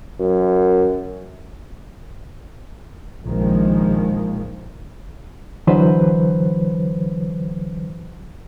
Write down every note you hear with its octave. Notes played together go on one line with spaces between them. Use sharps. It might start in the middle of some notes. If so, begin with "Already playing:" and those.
F#2
A#1 D#3 F3 G#3
D3 E3 F#3 B4 C5